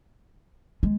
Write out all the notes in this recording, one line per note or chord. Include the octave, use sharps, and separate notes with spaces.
G#3